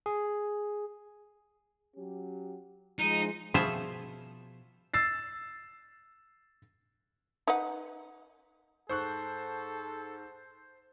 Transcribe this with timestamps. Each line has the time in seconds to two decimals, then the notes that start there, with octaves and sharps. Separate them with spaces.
0.06 G#4
1.96 F#3 C#4 G4
2.99 F3 G#3 D#4
3.54 B2 F3 F4 G#4 C5 E5
4.94 E6 A6 C7
7.47 D#4 B4 F#5
8.89 G#2 A4 C5 C#6 F#6